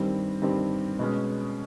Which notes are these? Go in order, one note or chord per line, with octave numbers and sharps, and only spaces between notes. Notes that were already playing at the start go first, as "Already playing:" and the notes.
Already playing: G2 D#3 G3 C4
G2 D#3 G3 C4
B2 G#3 C#4